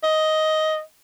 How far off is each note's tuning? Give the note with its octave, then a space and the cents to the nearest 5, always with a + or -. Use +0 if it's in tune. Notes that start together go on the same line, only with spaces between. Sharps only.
D#5 +5